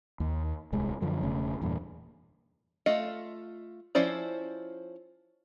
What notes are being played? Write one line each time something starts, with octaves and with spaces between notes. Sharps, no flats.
D#2
D1 C2 G#3
F#2 D3 F3
E1 C#3 A3
E2 G2 A#2
A3 F4 D#5
F3 C#4 E4 C5 D5